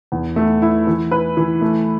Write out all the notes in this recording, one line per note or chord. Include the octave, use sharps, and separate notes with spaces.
E2
A3
E4
E3
B4
E3
A3